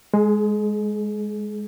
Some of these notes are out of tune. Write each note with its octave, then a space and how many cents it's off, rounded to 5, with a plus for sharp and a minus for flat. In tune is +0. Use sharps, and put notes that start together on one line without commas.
G#3 +0 G#4 +35